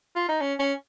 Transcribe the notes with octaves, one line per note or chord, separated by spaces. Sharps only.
F4
D#4
C#4
C#4